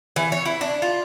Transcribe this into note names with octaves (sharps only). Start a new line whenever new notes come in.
E3
C#5
E4
D4
F4